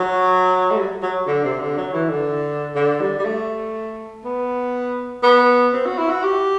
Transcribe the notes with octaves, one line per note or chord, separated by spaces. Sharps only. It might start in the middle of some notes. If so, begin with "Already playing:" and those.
Already playing: F#3
A3
G3
F#3
D3
C3
D3
F#3
E3
D3
D3
G3
G3
A3
B3
B3
C4
F#4
E4
F#4
G4